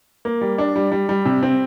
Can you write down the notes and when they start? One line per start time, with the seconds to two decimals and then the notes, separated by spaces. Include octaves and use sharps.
0.25 A#3
0.41 G3
0.58 D4
0.76 G3
0.92 G3
1.09 G3
1.25 C3
1.43 C4